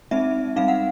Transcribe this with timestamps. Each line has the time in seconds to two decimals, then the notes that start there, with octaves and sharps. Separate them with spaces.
0.11 G#3 C4 D#4 E5
0.56 G3 C4 D#4 F5
0.68 F#5